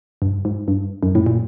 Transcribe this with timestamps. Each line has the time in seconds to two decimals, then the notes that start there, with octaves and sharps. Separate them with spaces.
0.22 G2
0.45 G#2
0.68 G2
1.03 F#2
1.15 A2
1.26 A#2